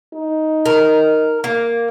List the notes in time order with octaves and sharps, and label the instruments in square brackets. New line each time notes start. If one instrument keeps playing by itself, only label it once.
[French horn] D#4
[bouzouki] A#4
A#3